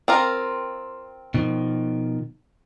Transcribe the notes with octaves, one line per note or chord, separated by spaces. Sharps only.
C4 F4 A#4
B2 D#3 F3